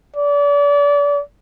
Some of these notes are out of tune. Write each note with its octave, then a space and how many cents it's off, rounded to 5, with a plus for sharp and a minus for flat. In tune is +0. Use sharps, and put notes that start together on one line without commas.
D5 -35